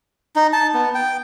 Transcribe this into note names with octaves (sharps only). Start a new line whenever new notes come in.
D#4
A5
B3
G5